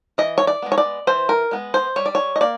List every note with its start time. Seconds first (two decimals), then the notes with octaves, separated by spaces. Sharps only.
0.18 E3 D#5
0.38 C#5
0.47 D5
0.62 G#3 B3
0.72 C#5
0.78 D5
1.07 E3 C5
1.29 A#4
1.51 G#3 B3
1.74 C5
1.96 G3 C#5
2.06 D5
2.15 C#5
2.36 D#5
2.41 A#3 D5